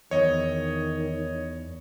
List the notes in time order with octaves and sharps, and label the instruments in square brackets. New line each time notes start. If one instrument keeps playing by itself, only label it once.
[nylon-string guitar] E2 [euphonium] D#3 [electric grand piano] C#5 D#5